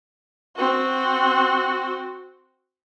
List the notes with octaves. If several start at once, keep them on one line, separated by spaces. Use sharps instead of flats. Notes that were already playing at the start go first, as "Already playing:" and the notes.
C4 F#4